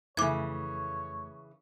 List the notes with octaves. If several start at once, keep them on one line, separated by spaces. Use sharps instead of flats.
F2 C#3 E3 A3 C#5 D6 G#6